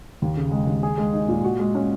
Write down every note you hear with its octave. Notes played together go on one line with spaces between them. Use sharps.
D#2
C#3
G#3
D#2
G#4
G#3
D#4
A#2
F#4
G#3
C#4